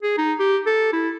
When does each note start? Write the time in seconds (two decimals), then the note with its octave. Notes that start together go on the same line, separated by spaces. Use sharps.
0.03 G#4
0.18 D#4
0.39 G4
0.66 A4
0.93 E4